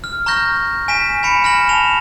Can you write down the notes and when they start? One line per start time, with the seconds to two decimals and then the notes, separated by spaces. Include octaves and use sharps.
0.04 F6
0.26 A#5 C#6 F6 G6 A#6
0.88 G#5 B6 E7
1.23 G#5 B5 C#7 D7 E7
1.44 G#5 F6 A#6 E7 F#7
1.69 A5 E7 F7 G7